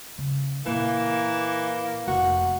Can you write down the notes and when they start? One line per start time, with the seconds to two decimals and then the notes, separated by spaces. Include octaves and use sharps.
0.18 C#3
0.66 A#2 E3 A#3
2.07 F1 F#4